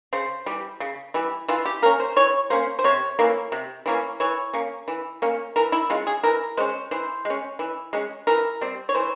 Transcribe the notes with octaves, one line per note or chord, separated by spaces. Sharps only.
C#3 C5
E3 G3
C#3
E3 G3
E3 F4
G4
A#3 C#4 A#4
C5
E3 C#5
A#3 C#4 C5
C5
C3 C#5
E3 A#3 C#4
C3
E3 A#3 C#4
E3 C#5
A#3 C#4
E3
A#3 C#4
E3 A#4
E4
G#3 C#4 F4
G#4
E3 A#4
G#3 C#4 C5
E3 C5
G#3
C#4
E3
G#3 C#4
E3 A#4
G3 C4
C#5
E3 C5